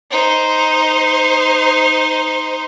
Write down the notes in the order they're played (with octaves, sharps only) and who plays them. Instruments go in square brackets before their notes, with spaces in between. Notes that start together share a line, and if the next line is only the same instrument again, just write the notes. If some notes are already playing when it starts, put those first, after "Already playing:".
[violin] D#4 C5